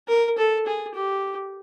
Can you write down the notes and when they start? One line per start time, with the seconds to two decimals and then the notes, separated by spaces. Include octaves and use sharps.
0.08 A#4
0.38 A4
0.66 G#4
0.95 G4